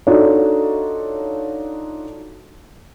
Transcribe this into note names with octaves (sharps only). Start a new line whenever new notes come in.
D4 D#4 F4 F#4 A4 C#5